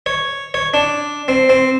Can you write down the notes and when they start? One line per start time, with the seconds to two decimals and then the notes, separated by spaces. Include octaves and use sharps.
0.06 C#5
0.54 C#5
0.74 D4
1.28 C4
1.49 C4